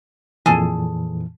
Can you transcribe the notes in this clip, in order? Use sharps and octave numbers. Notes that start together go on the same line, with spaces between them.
F2 A#2 E3 G#4 A4